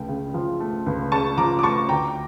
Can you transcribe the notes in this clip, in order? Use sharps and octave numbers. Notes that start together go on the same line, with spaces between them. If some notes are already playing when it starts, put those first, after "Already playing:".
Already playing: C#2 A3 G5
C#3
F3
A3
C#2
C#3 A5 C#6
F3 A#5 D6
D6
A3 A5 C#6
D2 G5 A#5